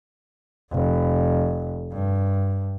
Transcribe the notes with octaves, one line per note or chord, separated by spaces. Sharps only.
F1
G2